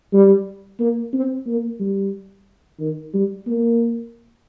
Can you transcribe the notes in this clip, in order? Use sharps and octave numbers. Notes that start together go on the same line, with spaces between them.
G3
A#3
C4
A#3
G3
D#3
G3
A#3